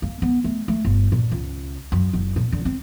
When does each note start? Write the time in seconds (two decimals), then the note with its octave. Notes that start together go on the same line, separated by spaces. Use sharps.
0.02 A#3
0.22 B3
0.44 A3
0.68 A3
0.85 G1
1.12 A#2
1.32 C#2
1.92 F#2
2.13 F#1
2.36 A#2
2.52 D3
2.65 C4